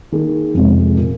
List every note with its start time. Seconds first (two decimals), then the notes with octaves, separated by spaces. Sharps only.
0.12 D#3 A#3 G#4
0.54 F2 C3 G#3
0.96 A#2 A#3